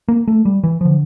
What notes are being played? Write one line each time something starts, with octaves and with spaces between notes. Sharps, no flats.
A#3
A3
G3
E3
D3 F3